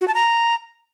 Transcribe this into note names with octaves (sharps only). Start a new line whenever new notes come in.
F#4
A5
A#5